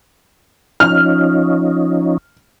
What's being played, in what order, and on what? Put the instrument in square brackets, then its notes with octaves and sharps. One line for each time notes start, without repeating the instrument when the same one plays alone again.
[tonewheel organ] F3 C#4 D#4 [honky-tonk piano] F6